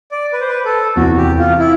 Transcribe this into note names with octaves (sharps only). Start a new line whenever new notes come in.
D5
B4
C5
B4
A4
E2 C3 E3 F#4
G4
F4
E4